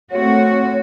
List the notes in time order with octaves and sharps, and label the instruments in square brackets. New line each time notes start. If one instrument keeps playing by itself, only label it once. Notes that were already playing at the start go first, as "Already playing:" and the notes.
[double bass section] A3 A#3 C4 [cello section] F#4 [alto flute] C#5